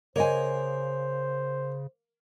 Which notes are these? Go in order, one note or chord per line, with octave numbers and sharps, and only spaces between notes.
C#3 A#3 C5 C#5 D#5 G#5